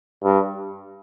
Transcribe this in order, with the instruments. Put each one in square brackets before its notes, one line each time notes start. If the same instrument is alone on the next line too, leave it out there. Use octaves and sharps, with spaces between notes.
[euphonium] G2